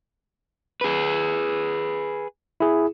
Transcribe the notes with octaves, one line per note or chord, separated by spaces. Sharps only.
G#4 B4
E4 G#4